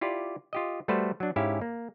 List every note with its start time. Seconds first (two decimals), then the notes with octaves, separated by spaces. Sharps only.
0.01 E4 F4 G4 D5
0.53 F4 G4 D#5
0.88 G3 A3 F#4 B4 C5 A5
1.20 F#3 D4
1.36 G#2 C#4 E4 G4 E5 F5
1.61 A#3